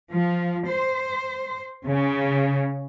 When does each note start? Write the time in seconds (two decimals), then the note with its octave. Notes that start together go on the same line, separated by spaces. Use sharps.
0.11 F3
0.67 C5
1.87 C#3